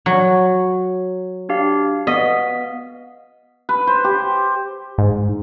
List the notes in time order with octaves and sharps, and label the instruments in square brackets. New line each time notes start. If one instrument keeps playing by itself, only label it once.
[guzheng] F#3
[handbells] D4 G4 F5
[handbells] B3 F5 B6 [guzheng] D#5
[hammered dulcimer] B4
C5
G4
[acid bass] G#2